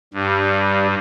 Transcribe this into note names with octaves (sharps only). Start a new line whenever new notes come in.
G2 G3